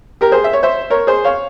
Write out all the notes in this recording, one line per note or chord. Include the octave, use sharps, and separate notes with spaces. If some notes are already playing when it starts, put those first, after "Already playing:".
G4 A#4
G#4 C5
E5
C#5
C5 E5
A#4 C#5
G#4 C5
C#5 F5